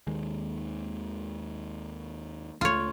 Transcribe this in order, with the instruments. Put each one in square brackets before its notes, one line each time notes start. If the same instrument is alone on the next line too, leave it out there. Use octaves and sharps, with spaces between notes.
[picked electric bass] D#2 D#3 G#3
[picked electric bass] C#2 A3 [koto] F4 C#5